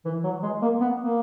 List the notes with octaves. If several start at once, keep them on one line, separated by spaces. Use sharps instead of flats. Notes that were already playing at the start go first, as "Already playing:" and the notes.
E3
F#3
G#3
A#3
B3
A#3